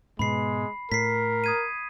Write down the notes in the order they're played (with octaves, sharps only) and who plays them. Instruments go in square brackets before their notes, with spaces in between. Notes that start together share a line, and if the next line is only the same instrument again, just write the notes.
[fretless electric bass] G#2 B2 B3 [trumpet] G#3 [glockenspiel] B5 C7
[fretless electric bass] A2 [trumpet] A#4 [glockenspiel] B6 C7
[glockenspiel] D#6 G#6 D#7